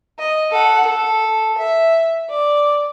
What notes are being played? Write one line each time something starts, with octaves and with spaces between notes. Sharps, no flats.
D#5
A4 F#5
A4
E5
D5